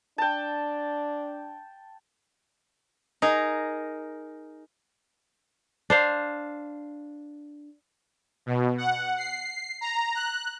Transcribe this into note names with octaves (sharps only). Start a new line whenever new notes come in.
D4 G5 A5
D#4 G#4 A#4
D4 C5 F5
B2
F#5
C7
A#5
F#6